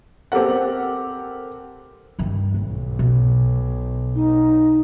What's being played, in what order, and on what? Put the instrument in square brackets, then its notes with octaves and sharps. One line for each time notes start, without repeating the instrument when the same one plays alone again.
[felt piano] C4 G4 A4 A#4 F#5
[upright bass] G2 D#3
[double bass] B1 [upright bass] G#2
[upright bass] B2
[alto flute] D#4